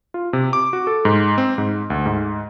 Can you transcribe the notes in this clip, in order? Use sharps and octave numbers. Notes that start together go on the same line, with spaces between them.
F4
C3
D6
F#4
A4
G#2
C4
G#2
D2
G#2